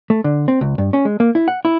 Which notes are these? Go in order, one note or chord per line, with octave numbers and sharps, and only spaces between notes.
A3
D3
C4
C#2
G2
C#4
G#3
A#3
E4
F#5
E4